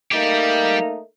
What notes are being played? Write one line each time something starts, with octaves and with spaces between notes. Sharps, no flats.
G3 A3 A#3 D#4 G4